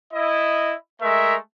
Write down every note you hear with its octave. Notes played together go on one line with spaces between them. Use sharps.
E4 D#5
G#3 A3 A#4 E5